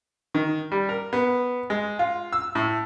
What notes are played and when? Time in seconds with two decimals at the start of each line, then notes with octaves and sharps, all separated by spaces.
0.34 D#3
0.72 G3
0.89 A#4
1.13 B3
1.70 G#3
1.99 F4
2.33 E6
2.55 A2